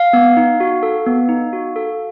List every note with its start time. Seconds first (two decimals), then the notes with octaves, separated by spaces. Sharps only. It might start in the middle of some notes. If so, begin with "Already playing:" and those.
Already playing: F5
0.13 B3
0.37 D#4
0.60 F#4
0.83 A4
1.06 B3
1.29 D#4
1.53 F#4
1.76 A4